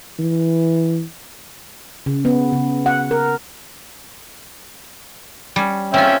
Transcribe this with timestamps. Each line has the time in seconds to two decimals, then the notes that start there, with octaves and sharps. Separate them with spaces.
0.19 E3
2.06 C#3
2.25 B3
2.53 C#3
2.86 F#5
3.11 A#4
5.56 G3 C#4
5.94 C4 C#4 F4 E5 G5